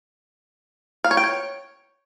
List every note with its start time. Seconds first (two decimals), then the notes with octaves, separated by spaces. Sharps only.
1.04 F5
1.11 C#5
1.17 G5
1.24 C#5